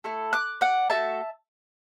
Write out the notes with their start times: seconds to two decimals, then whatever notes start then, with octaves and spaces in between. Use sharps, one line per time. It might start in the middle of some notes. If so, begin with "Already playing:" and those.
0.04 A3 E4 A4
0.33 D6 F#6
0.61 D5 F#5
0.90 A3 F#4 A4 E5 A5